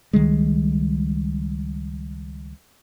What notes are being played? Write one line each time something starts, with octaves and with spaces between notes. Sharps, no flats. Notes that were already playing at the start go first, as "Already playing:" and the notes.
C#2 D#3 G3 G#3